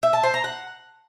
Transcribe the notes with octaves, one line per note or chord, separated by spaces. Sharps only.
E5
A5
C5
A#5
F#5